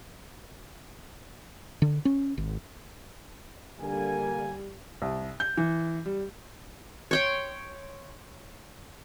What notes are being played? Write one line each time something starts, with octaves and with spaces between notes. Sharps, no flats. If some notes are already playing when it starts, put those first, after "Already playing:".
D3
C#4
G#1
D3 G3 A#3 G#5
C2
G6
E3
G3
C#5 G5 C6